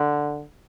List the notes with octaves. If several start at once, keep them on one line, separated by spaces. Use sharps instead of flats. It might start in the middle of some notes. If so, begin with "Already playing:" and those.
Already playing: D3